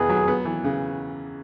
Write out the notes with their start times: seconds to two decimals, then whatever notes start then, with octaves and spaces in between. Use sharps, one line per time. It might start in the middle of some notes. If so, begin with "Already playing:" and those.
Already playing: E2 B2 B3 G#4
0.09 F#3
0.28 B3
0.45 E3
0.64 C#3